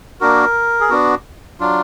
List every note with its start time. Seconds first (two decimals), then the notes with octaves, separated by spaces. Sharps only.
0.21 A#3 D4 F#4 A#4
0.81 G#4
0.90 B3 D4 F#4
1.60 F#3 D4 F4